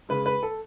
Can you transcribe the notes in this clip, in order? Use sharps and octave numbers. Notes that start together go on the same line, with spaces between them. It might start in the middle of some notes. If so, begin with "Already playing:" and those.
C#3 G#3 B4
B4
A4